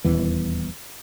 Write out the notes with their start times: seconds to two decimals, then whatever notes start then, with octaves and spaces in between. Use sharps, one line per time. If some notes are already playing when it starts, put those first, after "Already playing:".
0.04 D#1 E2 E3